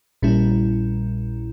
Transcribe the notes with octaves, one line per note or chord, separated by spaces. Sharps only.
A#1 A#2 G3 C#4 E4